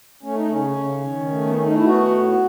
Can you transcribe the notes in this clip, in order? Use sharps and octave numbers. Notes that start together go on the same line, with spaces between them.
A3 C#4
D#4
C#3 C#4
C#3
D#3
A3
B3
A3 C#4
D#4
E4
B3 F#4
A2